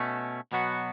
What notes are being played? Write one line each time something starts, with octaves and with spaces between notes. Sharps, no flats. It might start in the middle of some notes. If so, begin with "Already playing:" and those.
Already playing: B2 A3 C#4
B2 F#3 B3 F#4